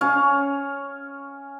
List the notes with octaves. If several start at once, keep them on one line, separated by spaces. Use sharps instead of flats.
C#4 C#5 F5